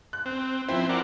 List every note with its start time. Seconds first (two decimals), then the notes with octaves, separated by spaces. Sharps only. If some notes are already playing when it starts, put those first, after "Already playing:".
0.13 F#6
0.25 C4
0.69 F3 C4 E4 C5
0.89 A#4 D5 F#5